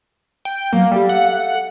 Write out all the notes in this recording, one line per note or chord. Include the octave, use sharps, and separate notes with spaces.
G5
F#3 A#3 B3 F5
G3 G4 A4 E5
F#5